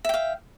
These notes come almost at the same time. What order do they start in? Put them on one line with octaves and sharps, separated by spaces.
E5 G5 F5